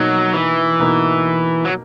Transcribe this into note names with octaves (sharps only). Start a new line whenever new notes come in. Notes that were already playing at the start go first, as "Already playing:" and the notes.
Already playing: B2 F#3 A#3 D#4
E3
B2 A#3 D#4
F#3